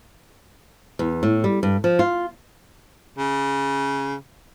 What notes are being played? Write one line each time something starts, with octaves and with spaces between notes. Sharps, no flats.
E2
A2
G3
G2
F3
F4
C#3